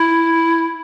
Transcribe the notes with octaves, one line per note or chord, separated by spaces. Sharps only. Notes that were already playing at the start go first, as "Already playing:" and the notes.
Already playing: E4